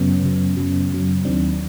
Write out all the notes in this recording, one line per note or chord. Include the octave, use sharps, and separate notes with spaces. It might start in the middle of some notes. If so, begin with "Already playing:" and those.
Already playing: F#2 C#3 F#3 B3 C#4
F#2 C#3 F#3
F#2 C#3 F#3
F#2 C#3 F#3
D#2 D#3 F#3 C4 D4